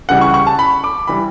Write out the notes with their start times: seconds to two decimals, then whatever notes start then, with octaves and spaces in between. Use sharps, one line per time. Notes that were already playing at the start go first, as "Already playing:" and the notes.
0.09 C#2 C#3 E3 G3 F#5
0.21 C#6
0.34 C#6
0.47 A5
0.59 B5
0.84 D6
1.07 E3 G3 B5